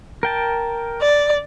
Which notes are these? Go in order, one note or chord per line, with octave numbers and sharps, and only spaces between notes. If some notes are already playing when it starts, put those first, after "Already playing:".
A#4 G5 A5
D5